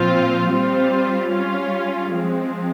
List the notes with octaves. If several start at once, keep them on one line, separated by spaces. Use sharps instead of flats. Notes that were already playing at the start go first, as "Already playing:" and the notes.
Already playing: A#2 F3 C4 F4
G3 C4 F4
G3 C#4 F4
F3 G#3 C4